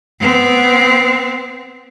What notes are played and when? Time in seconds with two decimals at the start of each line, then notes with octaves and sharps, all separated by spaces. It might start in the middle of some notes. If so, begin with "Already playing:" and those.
0.20 B3 C4